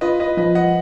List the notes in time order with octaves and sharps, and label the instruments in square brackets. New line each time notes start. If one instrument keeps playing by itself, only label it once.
[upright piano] F4 [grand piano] B4 D#5
[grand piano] B4 D#5
[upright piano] F3 [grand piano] B4 D#5
[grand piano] D#5 F#5